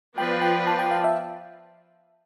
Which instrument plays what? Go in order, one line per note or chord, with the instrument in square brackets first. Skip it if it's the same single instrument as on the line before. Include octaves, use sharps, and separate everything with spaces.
[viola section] F3 B3 F4 B4 D5 [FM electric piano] G5
[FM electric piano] G5
A5
G5
F5
E5